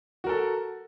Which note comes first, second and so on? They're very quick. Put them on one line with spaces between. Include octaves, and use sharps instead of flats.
F#4 A#4 A4